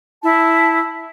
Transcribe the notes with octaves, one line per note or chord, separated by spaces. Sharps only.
E4 A5